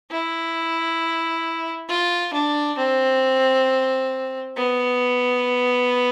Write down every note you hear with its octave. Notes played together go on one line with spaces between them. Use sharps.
E4
F4
D4
C4
B3